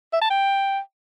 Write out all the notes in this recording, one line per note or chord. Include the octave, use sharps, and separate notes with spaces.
E5
A5
G5